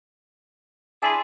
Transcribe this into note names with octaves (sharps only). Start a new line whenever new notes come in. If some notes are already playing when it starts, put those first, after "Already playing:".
D4 E4 G#4 G#5 C6